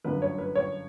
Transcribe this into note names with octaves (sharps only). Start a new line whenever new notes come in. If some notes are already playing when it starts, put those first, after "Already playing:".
G1 F#2 D3 B4
C#5
B4
C#5